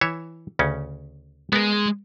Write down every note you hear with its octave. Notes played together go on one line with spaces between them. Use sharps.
E3 C#5 E5
D2 C#3 C#4
G#3 B3 A#4